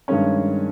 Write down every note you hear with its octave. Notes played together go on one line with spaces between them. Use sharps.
G2 D#3 G#3 C#4 C#5